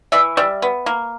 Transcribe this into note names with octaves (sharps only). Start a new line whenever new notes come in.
E3 D5 E5
G3 D5 E5
B3
A#3